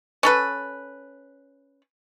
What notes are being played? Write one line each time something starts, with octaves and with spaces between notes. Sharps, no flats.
C#4 A4 B4